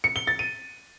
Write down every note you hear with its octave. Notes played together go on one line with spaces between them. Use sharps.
C#7
G7
A6
D#7